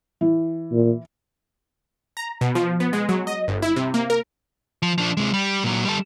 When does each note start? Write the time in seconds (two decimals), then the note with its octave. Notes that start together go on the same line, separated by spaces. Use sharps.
0.21 E3
0.72 A#2
2.17 A#5
2.41 B2
2.55 F3
2.80 B3
2.93 G#3
3.09 F#3
3.27 D#5
3.48 G1
3.62 E4
3.76 C3
3.94 A#3
4.10 A#4
4.82 F3
4.98 F3 D4
5.17 C3 G#3
5.34 G3
5.64 A#2 F#3
5.85 G3 A4